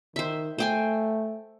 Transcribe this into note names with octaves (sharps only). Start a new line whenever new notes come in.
D#3 C5 E5
A3 C5 G5 G#5